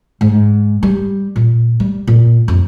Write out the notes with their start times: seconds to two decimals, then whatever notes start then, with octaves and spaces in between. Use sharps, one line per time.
0.21 G#2
0.83 G3
1.36 A#2
1.80 G3
2.07 A#2
2.48 F2